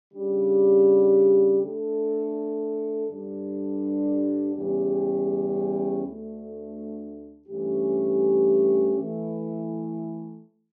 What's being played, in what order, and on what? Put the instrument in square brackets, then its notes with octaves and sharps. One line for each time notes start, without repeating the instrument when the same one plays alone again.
[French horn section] C#3 G3 D4 G4
D3 A3 D4 A4
G2 D3 G3 D4
E2 C#3 G3 C#4 G4
D2 D3 A3 D4
G2 E3 A3 C#4 G4
E3 A3 E4